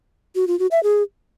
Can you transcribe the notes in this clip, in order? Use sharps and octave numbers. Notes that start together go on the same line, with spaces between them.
F#4
F4
F#4
E5
G#4